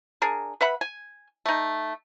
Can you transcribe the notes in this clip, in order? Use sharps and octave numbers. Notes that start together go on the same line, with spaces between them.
D4 G#4 A#4
B4 E5 F#5 B5
G#5
A3 D#4